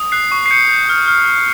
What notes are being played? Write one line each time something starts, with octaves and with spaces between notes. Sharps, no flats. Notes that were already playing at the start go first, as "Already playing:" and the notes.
Already playing: D#6
F#6 C7
C#6
C7
G6 C#7
G6
F6
F6
F6